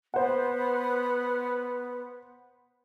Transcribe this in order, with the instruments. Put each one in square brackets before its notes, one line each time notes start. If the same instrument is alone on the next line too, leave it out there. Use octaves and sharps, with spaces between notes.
[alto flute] B3 [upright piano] C5 F#5